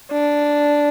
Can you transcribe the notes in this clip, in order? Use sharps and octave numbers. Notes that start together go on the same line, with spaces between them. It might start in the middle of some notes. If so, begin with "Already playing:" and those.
D4